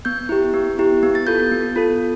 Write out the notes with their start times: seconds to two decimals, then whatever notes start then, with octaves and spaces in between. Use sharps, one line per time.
0.05 B3 G6
0.29 E4 G4
0.53 B3
0.79 E4 G4
1.03 B3
1.15 A6
1.27 F4 A4 G6
1.40 G6
1.52 B3
1.76 F4 A4